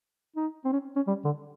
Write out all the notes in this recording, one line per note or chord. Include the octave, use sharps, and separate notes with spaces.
D#4
C4
C#4
C#4
G3
D3